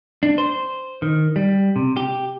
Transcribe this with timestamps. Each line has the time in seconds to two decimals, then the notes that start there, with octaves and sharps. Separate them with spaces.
0.23 D4
0.38 C5
1.02 D#3
1.36 G3
1.76 C3
1.97 G4